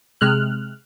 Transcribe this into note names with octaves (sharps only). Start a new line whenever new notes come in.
C3 G#3 F6 F#6